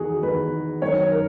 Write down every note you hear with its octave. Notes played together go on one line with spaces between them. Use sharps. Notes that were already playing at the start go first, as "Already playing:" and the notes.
Already playing: E2 D#3 F#4 G#4
E2 D#3 B4
F#2 D#3 C#5
A#4